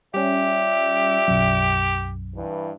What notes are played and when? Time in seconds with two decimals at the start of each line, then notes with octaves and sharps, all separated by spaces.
0.14 G3 C#4 F4 G4 D5 E5
1.28 B1 F#2
2.35 G2 E3